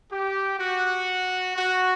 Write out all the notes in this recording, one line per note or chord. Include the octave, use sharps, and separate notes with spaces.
G4
F#4
F#4